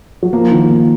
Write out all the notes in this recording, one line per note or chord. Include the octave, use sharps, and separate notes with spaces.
F#3
F3 A#3
D#3
A#3